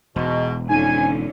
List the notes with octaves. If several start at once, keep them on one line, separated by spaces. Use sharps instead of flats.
E1 G#2 B2
F2 D3 C#4 D#4 G#5 D#7